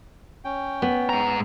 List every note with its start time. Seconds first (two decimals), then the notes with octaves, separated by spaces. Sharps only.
0.44 C#4 G5
0.82 B3
1.09 G#2 A#5